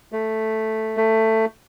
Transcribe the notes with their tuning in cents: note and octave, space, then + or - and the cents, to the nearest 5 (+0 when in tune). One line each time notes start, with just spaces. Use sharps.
A3 +0
A3 +15